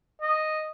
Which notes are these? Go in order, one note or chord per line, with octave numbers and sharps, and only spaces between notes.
D#5